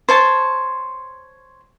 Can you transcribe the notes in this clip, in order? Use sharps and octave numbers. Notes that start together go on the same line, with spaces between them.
C5 C#5 A5